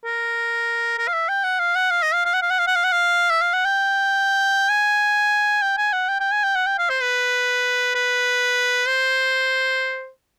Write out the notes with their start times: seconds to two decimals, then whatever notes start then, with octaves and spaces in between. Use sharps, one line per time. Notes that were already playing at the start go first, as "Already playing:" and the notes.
0.04 A#4
0.98 A#4
1.08 F5
1.13 E5
1.29 G5
1.44 F#5
1.59 F5
1.75 F#5
1.91 F5
2.02 D#5
2.13 F5
2.25 F5
2.34 F#5
2.42 F5
2.50 F#5
2.59 F5
2.67 F#5
2.75 F5
2.84 F#5
2.92 F5
3.30 E5
3.41 F5
3.53 F#5
3.65 G5
4.69 G#5
5.62 G5
5.78 G#5
5.93 F#5
6.08 G5
6.20 G5
6.32 G#5
6.44 G5
6.55 F#5
6.67 G5
6.79 F5
6.90 C5
7.02 B4
7.95 B4
8.87 C5